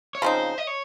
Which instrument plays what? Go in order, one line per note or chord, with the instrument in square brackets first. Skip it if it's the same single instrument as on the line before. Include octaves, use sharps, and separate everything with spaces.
[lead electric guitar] C#5
[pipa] C#3 F3 C4 D#4 [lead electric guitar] C5
[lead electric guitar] D#5
C#5